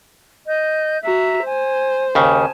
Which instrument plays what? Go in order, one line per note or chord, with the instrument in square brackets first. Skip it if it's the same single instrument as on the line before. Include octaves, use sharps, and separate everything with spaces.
[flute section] D#5 G6
[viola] F#4 [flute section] E5 A#5
[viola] C5 [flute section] G#5
[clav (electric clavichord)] D#2 C#3 [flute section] G#5 A5